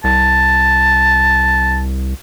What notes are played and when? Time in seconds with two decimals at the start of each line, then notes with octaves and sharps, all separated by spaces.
0.04 C2 A5